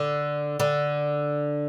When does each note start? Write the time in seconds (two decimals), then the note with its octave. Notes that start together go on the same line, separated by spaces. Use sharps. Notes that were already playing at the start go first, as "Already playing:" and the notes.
Already playing: D3
0.59 D3